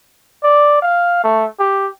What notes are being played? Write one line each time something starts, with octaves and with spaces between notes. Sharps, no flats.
D5
F5
A3
G4